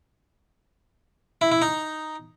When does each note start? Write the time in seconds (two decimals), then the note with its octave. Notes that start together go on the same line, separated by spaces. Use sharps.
1.41 E4
1.52 E4
1.62 D#4